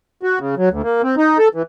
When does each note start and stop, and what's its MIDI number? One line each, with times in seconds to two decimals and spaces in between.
0.23 0.39 66
0.39 0.55 49
0.57 0.69 54
0.71 0.82 38
0.83 1.02 58
1.03 1.15 60
1.17 1.38 63
1.38 1.48 69
1.55 1.62 52